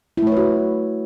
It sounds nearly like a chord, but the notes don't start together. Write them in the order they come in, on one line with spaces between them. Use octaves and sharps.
E4 A3 C#5 B4 F#4